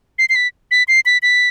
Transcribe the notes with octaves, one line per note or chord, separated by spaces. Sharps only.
C7
C7
B6
B6
C7
B6
B6